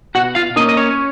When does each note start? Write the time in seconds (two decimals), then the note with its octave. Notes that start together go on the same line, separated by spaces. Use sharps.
0.15 B2 F#4 F#5
0.35 F4 F5
0.56 A#3 D#4 D#5
0.60 C#4
0.69 D#5
0.77 C#4 C#5